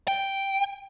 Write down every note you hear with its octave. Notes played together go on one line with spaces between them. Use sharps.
G5